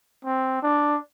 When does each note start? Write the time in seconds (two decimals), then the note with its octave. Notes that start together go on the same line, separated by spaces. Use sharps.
0.25 C4
0.62 D4